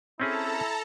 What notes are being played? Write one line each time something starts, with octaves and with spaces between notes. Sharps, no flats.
C4 C#4 E4 G#4 A4 A5 A#5